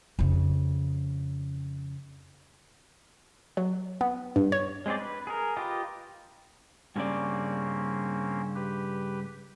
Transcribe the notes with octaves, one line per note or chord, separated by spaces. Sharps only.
F2 C#3
F#3
B3
G2
C#5
G#3 C4 G#4 C5 D5
B4
G#4 A#4
F4 G4 B4 D#5
G2 C#3 A#3 C4 C#4 D5
G4 B4